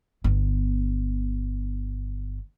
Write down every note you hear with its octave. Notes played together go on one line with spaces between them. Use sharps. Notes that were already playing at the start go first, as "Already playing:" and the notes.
G1 B3